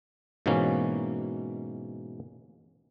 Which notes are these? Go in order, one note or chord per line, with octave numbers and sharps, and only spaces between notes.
G#2 B2 E3 A#3 C#4